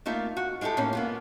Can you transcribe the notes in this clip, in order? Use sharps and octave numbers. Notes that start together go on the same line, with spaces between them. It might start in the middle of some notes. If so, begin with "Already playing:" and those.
A3 A#3 D#4 F4 E5
F#4
G#3 D#4 E4 G4 A4
A2 A#3 C#4 D#4
A#3 B3 F4